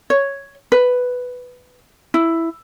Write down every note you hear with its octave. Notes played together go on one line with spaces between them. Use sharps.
C#5
B4
E4